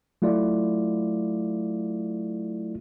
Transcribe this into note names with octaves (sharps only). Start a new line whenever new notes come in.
F#3 A3 E4 F4 D5